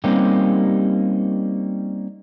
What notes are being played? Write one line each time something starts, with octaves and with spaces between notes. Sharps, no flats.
G3 A#3 C4 C#4 D#4 G4